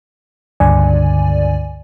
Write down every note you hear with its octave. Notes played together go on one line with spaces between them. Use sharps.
C#2 G2 D3 D5 G#5